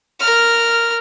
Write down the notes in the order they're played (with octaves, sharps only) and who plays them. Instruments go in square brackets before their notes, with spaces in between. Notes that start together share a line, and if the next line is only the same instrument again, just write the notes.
[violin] A#4 F6